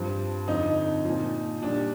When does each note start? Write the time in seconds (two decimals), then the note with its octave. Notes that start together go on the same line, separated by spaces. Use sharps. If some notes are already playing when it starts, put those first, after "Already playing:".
Already playing: G2 F3 C4
0.47 F2 D3 F3 D#4
1.05 A#2 F3
1.62 A#2 G3 D4